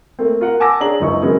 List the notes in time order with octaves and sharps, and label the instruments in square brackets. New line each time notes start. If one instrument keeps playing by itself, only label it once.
[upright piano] A3 A#3 C4
F4 A#4 F#5
F#5 G#5 A5 D6 E6 A#6
D4 G#4 C#5 A#5 F#7
F#1 C#2 D#4 C#6
D#3 F#3 G#3 B3 C#4 D#4